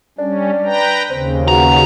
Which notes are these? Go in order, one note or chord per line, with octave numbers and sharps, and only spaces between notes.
G3 C#4 D4
B4 G5 A#5
D#2 C#3 C4
B2 F#4 A#5